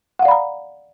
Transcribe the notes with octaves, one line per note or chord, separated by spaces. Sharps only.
D5 F5 F#5 A#5 B5